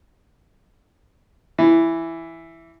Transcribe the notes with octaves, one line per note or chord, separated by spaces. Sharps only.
E3